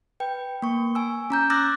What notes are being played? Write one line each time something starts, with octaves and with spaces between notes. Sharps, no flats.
B4 G5
A#3 C#6
G#5 E6
C#4 A#5 G6
D6 E6 F#6 A6 A#6